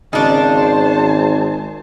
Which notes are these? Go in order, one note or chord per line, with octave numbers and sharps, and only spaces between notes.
G#1 C#3 D4 D#4 C5 A5